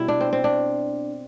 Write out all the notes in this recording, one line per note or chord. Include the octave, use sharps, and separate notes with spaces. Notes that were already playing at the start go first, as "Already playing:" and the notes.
Already playing: B2 G3 E4
D4
C4
C4
D4